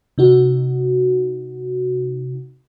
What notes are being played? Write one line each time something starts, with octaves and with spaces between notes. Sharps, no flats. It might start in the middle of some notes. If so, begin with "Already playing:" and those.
C3 D#4 F#4